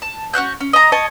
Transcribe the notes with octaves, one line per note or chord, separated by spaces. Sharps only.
A5
C#4 F#4 F#6 G6
C#4
D#5 A#5
C#5 D#5 A5